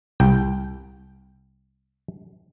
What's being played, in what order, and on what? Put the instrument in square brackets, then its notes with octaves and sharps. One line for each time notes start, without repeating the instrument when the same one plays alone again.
[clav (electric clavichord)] C2 G5